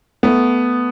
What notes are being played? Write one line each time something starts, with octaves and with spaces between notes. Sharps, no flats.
A3 B3